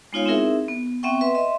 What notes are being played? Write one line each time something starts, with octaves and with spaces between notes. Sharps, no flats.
G#3 B3 D#4 F4 C#5 F5
C4 D#4 E4 G#4 A#4 E5
B3
B3 C4 E5 F#5 G5 C#6
B4 E5 C6
D#5 E5 C6